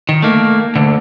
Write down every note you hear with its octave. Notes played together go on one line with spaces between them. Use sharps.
D#3
A3 A#3
D2 D3